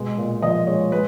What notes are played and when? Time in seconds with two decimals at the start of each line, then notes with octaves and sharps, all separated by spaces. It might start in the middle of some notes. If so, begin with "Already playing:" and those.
Already playing: B2 G#3
0.18 A#2
0.42 F3 D#5
0.67 G#3 C#5
0.92 G#3 B4